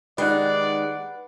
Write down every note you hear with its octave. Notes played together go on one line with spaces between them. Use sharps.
D#3 G#3 D#4 G4 B4 D5 F#5